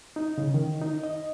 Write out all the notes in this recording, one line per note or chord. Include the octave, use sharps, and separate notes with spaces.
D#4
C#3
D#3
D#4
D#5